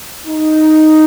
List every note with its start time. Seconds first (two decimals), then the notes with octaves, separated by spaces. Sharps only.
0.27 D#4